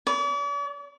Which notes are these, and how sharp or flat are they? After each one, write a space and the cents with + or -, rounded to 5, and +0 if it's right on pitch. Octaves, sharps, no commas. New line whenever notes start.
D5 -45